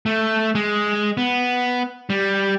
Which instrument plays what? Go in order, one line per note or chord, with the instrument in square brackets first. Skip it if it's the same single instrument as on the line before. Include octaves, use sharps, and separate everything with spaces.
[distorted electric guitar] A3
G#3
B3
G3